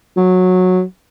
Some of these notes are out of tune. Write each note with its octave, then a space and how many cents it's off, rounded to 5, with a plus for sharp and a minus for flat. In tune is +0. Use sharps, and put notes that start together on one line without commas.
F#3 -15